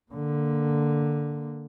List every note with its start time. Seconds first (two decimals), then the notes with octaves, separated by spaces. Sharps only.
0.12 D3 A#3